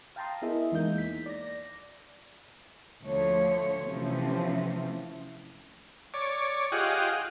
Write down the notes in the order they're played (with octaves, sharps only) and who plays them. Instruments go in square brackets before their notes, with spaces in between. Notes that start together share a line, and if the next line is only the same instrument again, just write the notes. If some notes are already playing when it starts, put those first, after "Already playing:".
[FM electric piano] F5 G5 A5 A#5 C6 D#6
B3 E4 G#4 A#4 D#5 E5
E2 G#3 A#3 D#4 E4 G6
B6
D5 A#6
[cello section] D2 F3 A3 C#5
C3 E3 F3 A3 C4 C#4
[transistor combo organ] C#5 D5
F4 G4 G#4 D#5 F#5